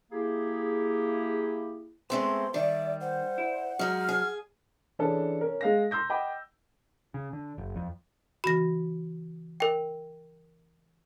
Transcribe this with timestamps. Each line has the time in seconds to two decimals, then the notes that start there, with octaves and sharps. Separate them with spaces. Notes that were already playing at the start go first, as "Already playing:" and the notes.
0.12 A#3 E4 G4 G#4
2.10 G#3 A3 B3 C4 C6
2.54 D#3 G3 D5 E5
3.01 C5 F#5
3.38 E4
3.79 F#3 G#3 D#4 F6
4.09 G#4
4.99 E3 C#4 D4 G#4 A4
5.41 C#4 A#4
5.61 G#3 F5 A#6
5.91 A#5 C6 E6 G6 A#6
6.10 D#5 F#5 G5 B5 D6
7.14 C#3
7.33 D3
7.58 F#1
7.76 F2
8.44 C#3 E3 F#4 B5 A#6
9.60 A#4 G5